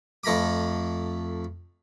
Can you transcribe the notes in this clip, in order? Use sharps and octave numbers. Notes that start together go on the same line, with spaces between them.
F2 A3 A#5 B5 D6